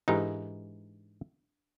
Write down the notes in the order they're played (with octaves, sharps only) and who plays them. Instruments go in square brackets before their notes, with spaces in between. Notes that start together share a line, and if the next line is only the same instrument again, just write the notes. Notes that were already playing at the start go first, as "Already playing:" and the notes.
[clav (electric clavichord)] G#2 E3 D#4 [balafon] D4 G4 A4